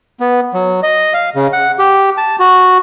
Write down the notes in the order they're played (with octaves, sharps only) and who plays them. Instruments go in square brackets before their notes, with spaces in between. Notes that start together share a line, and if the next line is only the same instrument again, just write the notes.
[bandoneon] B3
F#3
D#5
F5
C#3
F#5
G4
A5
F#4